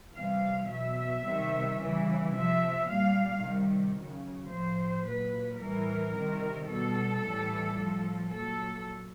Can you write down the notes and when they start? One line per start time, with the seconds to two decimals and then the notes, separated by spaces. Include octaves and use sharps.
0.16 C3 E3 G3 F5
0.70 B2 F#3 E5
1.25 C3 D#3 G3
1.79 C#3 E3 G3
2.34 C3 F3 E5
2.88 A#2 G3 F5
3.42 C3 D#3 G3
3.98 C#3 F#3
4.52 A2 F3 C5
5.06 A#2 F#3 B4
5.61 A2 E3 G3 A#4
6.15 C3 D#3 G3
6.70 B2 G3 A4
7.25 A2 E3 G3
7.79 A2 F3
8.33 A#2 F#3 A4